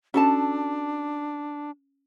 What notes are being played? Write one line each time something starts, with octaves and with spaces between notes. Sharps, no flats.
C#4 D4 F#4 A4 A5